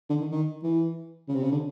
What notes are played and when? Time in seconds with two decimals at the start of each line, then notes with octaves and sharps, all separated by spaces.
0.09 D3
0.20 D#3
0.31 D#3
0.63 E3
1.28 C#3
1.35 C3
1.43 C#3
1.52 D3